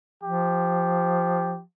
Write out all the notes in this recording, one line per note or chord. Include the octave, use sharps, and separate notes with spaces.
F3 G4